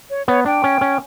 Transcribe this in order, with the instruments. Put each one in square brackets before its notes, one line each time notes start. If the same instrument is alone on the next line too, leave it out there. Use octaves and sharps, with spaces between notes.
[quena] C#5
[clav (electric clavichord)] B3 [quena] C#5
[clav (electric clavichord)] D4 [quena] G5
[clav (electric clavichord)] C#4
C#4